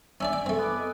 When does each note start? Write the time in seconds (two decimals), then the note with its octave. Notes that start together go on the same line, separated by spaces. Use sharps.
0.21 C#4 D4 D5 E5 G#5
0.33 G5
0.46 A3 C4
0.59 B3 D6
0.76 D#5